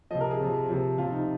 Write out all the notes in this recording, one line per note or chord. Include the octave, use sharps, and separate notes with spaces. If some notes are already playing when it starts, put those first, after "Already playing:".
C3 F3 D#5
A#4
G#4
C3 F3
C3 F3
C3 F3 F4
D#4